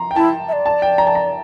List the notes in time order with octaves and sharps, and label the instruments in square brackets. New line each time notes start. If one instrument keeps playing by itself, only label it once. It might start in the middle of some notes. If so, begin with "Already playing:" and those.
Already playing: [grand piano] A#5 C6
G5
[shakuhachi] E4 [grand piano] A5
[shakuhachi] E5
D5
[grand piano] A5
G5
A#5
A5
A#5